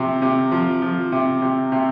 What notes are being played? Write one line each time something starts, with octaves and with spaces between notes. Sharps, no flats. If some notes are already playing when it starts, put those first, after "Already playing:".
Already playing: C3 F3
C3
F3
F3
C3
C3
C3